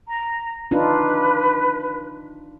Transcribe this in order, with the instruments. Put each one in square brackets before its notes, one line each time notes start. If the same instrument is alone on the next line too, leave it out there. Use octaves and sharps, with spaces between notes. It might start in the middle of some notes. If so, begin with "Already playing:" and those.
[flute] A#5
[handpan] D4 D#4 F4 [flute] B4